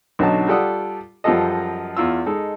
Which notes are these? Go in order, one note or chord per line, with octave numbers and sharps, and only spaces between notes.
B1 D3 F#3 C#4 D#4 A5
G3 F4 A4 D5 F#5 D#6
F#2 F3 G3 F4 A4 D#5
E2 F4 E6
G#3 D#4 A4